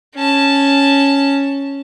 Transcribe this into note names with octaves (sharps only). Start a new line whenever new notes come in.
C#4 A5